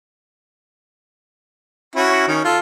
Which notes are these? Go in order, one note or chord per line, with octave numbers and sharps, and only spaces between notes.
C#4 E4 F#4
D#3 C#4
F4 A4